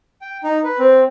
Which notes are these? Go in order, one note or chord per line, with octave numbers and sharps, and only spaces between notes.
G5
D#4
B4
C4